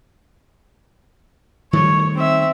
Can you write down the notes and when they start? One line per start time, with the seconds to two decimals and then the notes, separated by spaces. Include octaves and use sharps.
1.73 D#3 G3 A3 C#5
2.15 C4 E5